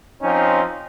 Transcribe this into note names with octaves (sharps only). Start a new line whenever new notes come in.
F3 C4 C#4 D#4